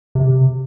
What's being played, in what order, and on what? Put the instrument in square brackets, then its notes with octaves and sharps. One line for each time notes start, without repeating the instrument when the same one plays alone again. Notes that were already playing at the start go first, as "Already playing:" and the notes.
[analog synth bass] C3